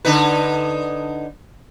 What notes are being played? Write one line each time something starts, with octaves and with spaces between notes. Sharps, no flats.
D3 D#4 B4